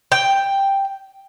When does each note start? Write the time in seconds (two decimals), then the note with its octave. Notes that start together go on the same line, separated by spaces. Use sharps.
0.12 G5